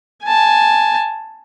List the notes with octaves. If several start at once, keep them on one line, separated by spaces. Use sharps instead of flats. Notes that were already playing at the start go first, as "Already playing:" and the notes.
G#5 A5